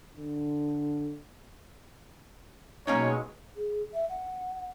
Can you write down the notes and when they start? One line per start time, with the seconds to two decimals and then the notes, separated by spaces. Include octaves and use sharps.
0.16 D3
2.87 B2 F#3 G#3 A#3 C#4 D#4 C#5
3.56 G#4
3.93 E5
4.09 F#5